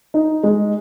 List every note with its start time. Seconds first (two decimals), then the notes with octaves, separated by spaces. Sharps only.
0.14 D#4
0.43 G#3